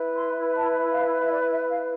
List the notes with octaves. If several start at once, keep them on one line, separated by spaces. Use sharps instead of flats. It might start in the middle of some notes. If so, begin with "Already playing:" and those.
Already playing: E4 B4
C6
A5
F5
E5
D5
E5
F5